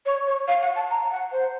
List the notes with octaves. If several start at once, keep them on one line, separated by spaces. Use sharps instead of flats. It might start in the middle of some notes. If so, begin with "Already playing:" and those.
C#5
C#5
F5
F#5
A5
A#5
F#5
C5